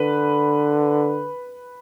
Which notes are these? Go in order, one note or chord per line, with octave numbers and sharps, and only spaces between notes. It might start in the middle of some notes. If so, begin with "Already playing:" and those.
Already playing: D3 B4